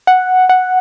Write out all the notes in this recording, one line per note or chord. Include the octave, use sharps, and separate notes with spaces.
F#5
F#5